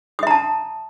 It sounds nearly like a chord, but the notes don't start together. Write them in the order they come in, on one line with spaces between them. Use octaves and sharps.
D#6 E5 A#5 A5